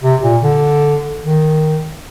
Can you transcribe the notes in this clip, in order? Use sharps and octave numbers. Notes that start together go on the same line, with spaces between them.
C3
A#2
D3
D#3